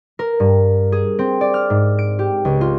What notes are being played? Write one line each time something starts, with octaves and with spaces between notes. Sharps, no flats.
A#4
G2
G#4
C4
D5
F6
G#2
D7
G4
C#2
F4